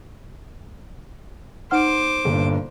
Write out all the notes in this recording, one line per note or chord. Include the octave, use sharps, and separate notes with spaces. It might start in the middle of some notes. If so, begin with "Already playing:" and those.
D#4 C5 F#5 D6 F6
G1 G2 A#2